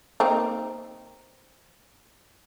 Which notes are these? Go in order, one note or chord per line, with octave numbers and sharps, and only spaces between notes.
A#3 C4 D#4